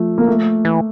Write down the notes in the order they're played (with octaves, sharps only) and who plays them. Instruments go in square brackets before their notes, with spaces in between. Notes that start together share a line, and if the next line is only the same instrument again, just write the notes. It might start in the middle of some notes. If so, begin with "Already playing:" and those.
Already playing: [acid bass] F3 [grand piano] A3
[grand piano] A#3
A3
[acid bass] E3